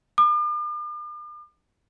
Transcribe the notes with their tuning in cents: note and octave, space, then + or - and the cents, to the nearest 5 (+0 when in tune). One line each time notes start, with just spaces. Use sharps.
D6 +45